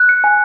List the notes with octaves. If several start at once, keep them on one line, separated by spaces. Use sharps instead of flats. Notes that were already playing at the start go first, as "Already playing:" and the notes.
Already playing: F#6
C#7
G#5